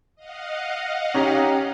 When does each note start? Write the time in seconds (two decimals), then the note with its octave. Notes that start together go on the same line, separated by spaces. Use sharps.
0.16 D#5 F5 F#5
1.14 C#4 D#4 G4